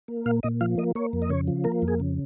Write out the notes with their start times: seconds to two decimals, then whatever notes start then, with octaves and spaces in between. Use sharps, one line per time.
0.08 A#3
0.26 A#2 F5
0.43 A#2 D#5
0.61 F3 F5
0.78 A#3 D#5
0.95 A#3 C#5
1.13 F2
1.22 D#5
1.30 C#3 C#5
1.48 F3
1.64 A#3 A#4
1.82 F2
1.88 G#4
2.00 C#3